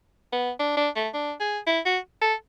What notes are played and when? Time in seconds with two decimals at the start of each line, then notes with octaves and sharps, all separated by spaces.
0.33 B3
0.60 D4
0.77 D4
0.96 A3
1.14 D4
1.40 G#4
1.67 E4
1.86 F#4
2.22 A4